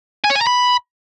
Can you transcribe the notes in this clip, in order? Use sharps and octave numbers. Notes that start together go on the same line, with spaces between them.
G#5
C#5
G#5
A#5
B5